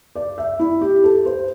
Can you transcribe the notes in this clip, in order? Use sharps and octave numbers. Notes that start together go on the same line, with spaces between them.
D5
E5
E4
G4
A4
C5